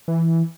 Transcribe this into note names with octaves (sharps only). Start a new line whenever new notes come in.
E3